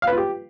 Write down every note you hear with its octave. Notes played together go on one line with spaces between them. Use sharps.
F5
B4
F4
G4